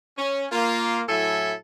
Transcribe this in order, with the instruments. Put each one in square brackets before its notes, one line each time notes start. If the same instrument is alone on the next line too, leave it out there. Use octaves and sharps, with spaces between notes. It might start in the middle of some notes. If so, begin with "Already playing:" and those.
[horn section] C#4
A#3 F4
A2 F#3 E4 A4 E5 G#5